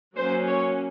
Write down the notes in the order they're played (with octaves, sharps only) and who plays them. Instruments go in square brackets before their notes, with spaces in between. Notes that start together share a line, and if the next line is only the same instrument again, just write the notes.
[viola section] F#3 A#3 C#4 C5
C#5